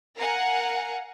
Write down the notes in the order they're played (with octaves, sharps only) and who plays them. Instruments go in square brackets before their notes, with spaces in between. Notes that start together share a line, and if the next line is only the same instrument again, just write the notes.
[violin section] A#4 F5 F#5 G#5 A#5